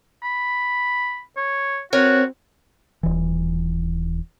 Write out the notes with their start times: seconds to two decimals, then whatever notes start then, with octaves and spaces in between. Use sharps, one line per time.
0.23 B5
1.37 C#5
1.93 C4 F#4 A#4 B4 C#5
3.03 D#1 E3